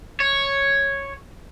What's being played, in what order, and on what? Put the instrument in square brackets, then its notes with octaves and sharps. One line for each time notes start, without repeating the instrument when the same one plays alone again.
[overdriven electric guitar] C#5